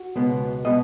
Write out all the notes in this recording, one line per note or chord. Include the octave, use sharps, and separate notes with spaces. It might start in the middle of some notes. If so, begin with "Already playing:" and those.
Already playing: F#4
C#2 B2 G#3 B3
B2 G#3 B3 D#5